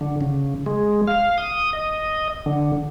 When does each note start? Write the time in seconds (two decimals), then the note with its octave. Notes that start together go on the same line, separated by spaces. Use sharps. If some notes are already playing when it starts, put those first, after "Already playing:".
0.01 D3
0.21 C#3
0.66 G#3
1.07 F5
1.38 D#6
1.73 D#5
2.46 D3